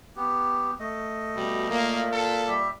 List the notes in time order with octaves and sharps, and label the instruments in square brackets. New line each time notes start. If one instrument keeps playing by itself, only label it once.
[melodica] B3 G4
A3 D#5
[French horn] B2 [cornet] G3
[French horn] A#2 [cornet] A#3
[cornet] A4
[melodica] G3 G4 E5